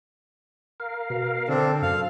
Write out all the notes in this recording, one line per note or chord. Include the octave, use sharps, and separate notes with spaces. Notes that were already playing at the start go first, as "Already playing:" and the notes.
A#4 F5
B2
D3 C4 D4 A4
F#2 F5